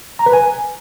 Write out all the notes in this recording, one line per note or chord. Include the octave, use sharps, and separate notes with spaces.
A#5
B4
G#5